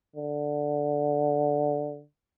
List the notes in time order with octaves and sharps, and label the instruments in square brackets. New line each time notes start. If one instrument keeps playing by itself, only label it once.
[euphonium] D3